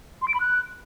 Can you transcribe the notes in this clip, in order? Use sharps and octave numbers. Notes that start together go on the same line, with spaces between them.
C6
D7
B5
F#6